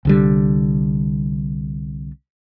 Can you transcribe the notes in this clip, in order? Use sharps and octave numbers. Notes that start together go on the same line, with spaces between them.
C2 D3 G3